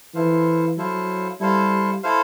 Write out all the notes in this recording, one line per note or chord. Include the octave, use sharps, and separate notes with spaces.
E3 E4 A4 C5 F5
F#3 E4 A4 C5 F5
G3 E4 A4 C5 F5
E4 A4 C5 F5